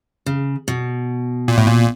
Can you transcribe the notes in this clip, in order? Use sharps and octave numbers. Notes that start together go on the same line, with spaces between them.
C#3
B2
A#2
A2
A#2